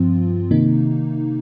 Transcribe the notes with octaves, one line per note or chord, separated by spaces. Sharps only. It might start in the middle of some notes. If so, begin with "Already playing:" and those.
Already playing: G2 F3 C4 F4
C3 D#3 A#3 D#4